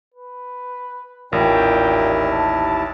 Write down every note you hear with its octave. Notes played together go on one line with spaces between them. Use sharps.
B4
A1 D#2 A#2 E4 G5
A5